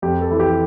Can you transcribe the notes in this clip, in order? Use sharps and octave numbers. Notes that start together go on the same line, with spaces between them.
F2 G4
A4
E3
G4